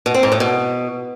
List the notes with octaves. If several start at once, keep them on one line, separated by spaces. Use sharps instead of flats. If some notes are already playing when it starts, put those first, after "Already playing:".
B2
C4
G#2
A2
B2